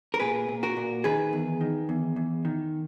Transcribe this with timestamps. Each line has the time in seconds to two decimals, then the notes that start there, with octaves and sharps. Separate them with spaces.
0.14 A#4
0.20 A#2 G#4 B4
0.49 A#2
0.63 F#4 A#4
0.77 A#2
1.04 D#3 G#4 B4
1.33 E2
1.61 D#3
1.89 E2
2.16 E2
2.45 D#3